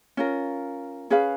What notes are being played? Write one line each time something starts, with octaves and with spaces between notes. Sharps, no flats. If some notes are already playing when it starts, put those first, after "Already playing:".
C#4 F4 A#4
C#4 G#4 B4 F5